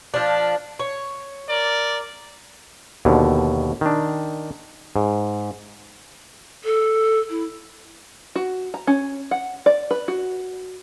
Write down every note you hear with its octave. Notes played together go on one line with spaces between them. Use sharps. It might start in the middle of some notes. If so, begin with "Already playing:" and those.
F3 D4
C#5
A#4 D5
D#2 B2 D3
D#3 D4
G#2
A4
E4
F#4
A#5
C#4
F#5
D5
B4
F#4